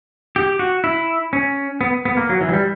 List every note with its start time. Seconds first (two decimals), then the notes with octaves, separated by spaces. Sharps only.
0.36 G4
0.59 F#4
0.84 E4
1.33 C#4
1.81 B3
2.05 B3
2.17 A#3
2.29 F#3
2.41 E3
2.49 F#3
2.53 G3